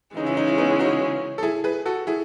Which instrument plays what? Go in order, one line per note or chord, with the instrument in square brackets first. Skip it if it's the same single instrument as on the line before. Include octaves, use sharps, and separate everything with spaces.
[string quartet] C#3 E3 G#3 C#4 [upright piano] D#4
[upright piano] E4
D#4
E4
B3 D#4
D#4 F#4
A4
E4 G#4
G#4 B4
F#4 A4
E4 G#4